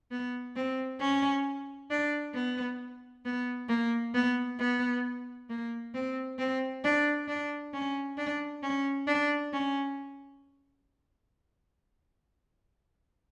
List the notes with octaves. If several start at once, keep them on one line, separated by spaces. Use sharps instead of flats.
B3
C4
C#4
D4
B3
B3
A#3
B3
B3
A#3
C4
C4
D4
D4
C#4
D4
C#4
D4
C#4